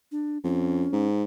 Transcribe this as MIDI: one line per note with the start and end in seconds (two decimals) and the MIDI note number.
0.12 0.38 62
0.44 0.86 41
0.44 1.07 61
0.93 1.24 44